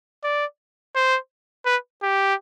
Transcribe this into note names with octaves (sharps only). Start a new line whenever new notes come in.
D5
C5
B4
G4